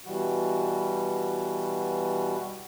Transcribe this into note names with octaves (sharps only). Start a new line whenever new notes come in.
B2 E3 G3 F#4